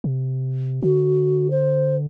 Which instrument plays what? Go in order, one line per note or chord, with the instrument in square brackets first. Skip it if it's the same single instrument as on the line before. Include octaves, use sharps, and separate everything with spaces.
[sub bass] C3
[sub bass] D3 [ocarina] F#4
[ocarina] C5